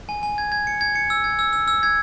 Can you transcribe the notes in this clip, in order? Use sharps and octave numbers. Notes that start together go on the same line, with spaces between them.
G#5
G#5
G#6
G#6
C#7
G#6
C#7
E6
G#6
E6
E6
E6
G#6